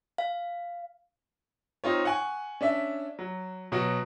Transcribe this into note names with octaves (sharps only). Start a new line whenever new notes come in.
F5
C4 D#4 F4 C#5
F#5 G#5 C#6
C#4 D4 E5
F#3
B2 F#3 F#4